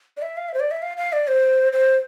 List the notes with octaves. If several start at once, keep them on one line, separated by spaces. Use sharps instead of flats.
D5
E5
F5
E5
C5
D5
E5
F5
F5
D5
C5
C5